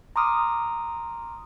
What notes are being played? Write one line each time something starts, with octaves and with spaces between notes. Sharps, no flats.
A#5 C6 D6 D#6 F6